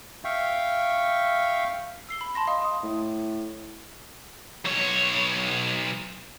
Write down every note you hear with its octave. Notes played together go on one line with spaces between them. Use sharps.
E5 F5 G5 C#6
E6 C7 G7
B5
A5 C6 A#6
D#5 F5 C6 D#6
C6 D#6
A2
B1 C#5